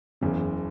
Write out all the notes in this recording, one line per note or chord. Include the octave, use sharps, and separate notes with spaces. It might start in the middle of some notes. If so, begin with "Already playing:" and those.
F#1 E2 C#3